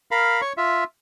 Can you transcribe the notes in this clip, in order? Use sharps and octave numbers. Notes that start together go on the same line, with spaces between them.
A#4 F5 B5
C#5 C#6
F4 E5